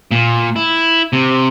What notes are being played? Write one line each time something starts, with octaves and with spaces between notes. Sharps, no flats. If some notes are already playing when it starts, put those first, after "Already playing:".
A#2
E4
C3